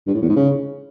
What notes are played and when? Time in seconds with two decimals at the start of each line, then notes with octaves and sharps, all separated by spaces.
0.07 G2
0.14 A2
0.22 E2
0.29 G#2
0.36 C#3